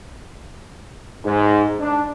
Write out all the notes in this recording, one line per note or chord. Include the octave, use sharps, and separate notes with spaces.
G#2
D4